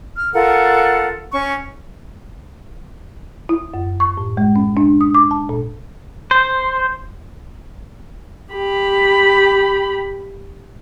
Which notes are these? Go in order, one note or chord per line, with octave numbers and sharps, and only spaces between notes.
F6
F4 A4 A#4 F#5
C#4 C#6
E4
F#2
C#6
A2
G#3
C#4
D4
D#6
D6
A5
A#2
C5
G4 B5